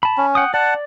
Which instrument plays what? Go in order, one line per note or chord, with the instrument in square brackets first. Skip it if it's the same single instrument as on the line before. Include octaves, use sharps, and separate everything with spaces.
[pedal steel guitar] A5 B5
[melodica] C#4
[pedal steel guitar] F#5 G5 D#6
[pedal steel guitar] D5 [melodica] F#5 A5